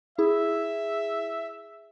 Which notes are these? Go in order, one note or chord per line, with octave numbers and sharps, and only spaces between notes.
E4 G#4 E5